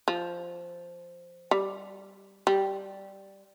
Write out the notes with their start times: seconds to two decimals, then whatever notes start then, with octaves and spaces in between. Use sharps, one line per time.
0.08 F3
1.51 G3
2.47 G3